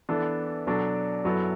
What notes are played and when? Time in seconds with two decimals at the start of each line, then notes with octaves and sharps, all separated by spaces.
0.09 E3 B3 D4 A4
0.67 B2 F#3 D4 A4 D5
1.24 F#2 F#3 B3 E4 A4